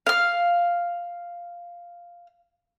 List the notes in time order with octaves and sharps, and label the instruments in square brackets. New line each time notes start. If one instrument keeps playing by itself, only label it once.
[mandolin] F5 F6